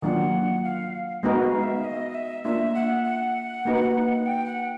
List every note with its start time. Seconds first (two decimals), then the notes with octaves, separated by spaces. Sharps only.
0.02 D#3 F#3 A#3 D4 F4 F#5
0.64 F5
1.23 G#3 B3 D#4 F#4 A#4 D#5
1.44 F5
1.63 E5
1.85 D#5
2.15 E5
2.44 A#3 D4 F4 E5
2.74 F#5
3.05 F#5
3.65 A#3 D#4 F#4 B4
4.26 G5
4.46 F#5